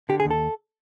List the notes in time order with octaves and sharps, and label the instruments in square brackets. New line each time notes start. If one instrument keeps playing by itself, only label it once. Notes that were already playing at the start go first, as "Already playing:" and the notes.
[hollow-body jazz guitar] D3 G4
G#4
D#2
A4